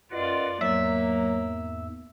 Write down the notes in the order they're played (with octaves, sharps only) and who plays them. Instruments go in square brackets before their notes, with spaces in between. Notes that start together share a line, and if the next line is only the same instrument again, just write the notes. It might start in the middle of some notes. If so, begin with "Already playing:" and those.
[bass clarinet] F#2 [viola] F4 D5 [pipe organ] B4 D#5 F#5
[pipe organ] E2 G#2 [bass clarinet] F#3 [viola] A#3 [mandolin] E5